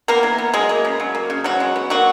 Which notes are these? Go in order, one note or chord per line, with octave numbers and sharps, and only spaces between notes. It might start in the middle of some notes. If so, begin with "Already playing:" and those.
A#3 B3 A#4
E3
B3
F#3 G#3 G#4
A#3
C#3
F#3
A#3
C#3
E3 F#3 F#4
G#3
B3
F#3 A#3 F#4